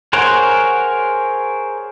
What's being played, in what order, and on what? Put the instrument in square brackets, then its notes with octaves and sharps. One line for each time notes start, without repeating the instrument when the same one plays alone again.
[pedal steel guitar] G#4 A#4 C5 C#5 F#5